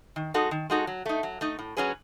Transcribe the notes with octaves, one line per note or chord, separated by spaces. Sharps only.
D#3
G#3 D#4 F#4 A4
D#3
G#3 D#4 F#4 A4
F#3
A3 D#4
F#3
A3 D#4
A2
F#3 C#4 G#4 B4